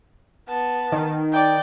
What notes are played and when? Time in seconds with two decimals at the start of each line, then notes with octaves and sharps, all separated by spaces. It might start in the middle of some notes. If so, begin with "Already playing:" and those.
0.48 B3 A5
0.92 D#3
1.32 D5 G5